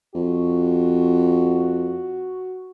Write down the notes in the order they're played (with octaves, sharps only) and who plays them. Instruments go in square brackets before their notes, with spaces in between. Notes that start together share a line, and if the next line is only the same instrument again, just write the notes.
[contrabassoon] F2 [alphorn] F#4